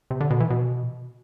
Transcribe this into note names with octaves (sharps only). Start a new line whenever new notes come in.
C3
D3
B2
E3
B2